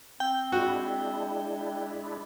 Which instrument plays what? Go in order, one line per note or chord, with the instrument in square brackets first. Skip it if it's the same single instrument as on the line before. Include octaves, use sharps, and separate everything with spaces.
[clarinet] C4 [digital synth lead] G5
[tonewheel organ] G#3 D4 E4 [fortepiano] F#4